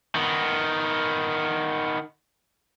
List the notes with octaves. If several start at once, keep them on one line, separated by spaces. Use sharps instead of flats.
D#3 B3